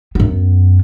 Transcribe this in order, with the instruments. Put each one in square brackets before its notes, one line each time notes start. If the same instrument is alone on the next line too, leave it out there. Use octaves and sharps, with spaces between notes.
[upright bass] F#2 B3